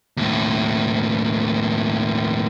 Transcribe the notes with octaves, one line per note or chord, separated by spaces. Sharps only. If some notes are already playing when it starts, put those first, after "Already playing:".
D#2 A2